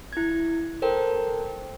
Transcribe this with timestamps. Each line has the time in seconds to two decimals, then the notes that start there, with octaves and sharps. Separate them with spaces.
0.13 E4 G#6
0.82 A4 A#4 C5 G5